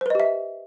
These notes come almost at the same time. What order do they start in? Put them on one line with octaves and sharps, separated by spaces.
C5 B4 D#5 G4 E5